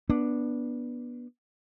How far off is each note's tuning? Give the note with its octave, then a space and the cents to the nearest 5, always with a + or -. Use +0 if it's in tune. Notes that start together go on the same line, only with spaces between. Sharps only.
B3 -20 D4 +0